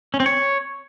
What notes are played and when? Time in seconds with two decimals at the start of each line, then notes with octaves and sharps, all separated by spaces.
0.14 C#4
0.20 C4
0.26 C#5